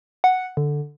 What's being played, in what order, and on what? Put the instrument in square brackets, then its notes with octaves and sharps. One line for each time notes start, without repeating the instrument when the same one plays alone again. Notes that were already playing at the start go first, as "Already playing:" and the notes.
[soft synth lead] F#5
D3